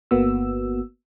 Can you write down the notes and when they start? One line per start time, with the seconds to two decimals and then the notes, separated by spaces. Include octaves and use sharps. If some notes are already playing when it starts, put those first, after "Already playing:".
0.11 G1 A#3 B3 F#4 E6